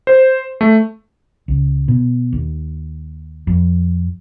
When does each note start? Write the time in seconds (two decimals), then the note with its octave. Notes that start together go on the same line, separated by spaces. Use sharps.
0.07 C5
0.61 A3
1.48 C#2
1.88 B2
2.33 D#2
3.47 F2